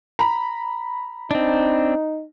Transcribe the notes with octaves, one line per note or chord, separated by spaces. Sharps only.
A#5 B5
C4 D4 D#4